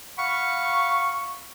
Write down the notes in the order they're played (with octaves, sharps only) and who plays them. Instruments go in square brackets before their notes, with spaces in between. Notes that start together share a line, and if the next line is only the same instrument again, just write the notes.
[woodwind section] F5 F#5 B5 C#6